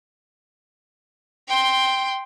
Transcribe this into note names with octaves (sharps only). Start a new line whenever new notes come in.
G5 C6